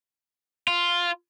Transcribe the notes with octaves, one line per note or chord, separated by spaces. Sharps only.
F4